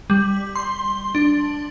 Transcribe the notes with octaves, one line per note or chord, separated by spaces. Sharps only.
G3
C6
D4